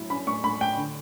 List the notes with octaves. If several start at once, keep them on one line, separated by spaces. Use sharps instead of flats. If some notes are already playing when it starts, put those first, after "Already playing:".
Already playing: A2 F#3 E4
C#4 B5
A2 C#6
A2 B5
A2 G5
D3